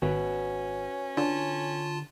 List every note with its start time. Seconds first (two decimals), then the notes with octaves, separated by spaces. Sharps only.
0.02 G#1 C#4 F#4 B4
1.17 D3 F4 A5